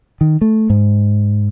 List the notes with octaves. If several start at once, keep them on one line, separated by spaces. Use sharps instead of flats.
D#3
A3
G#2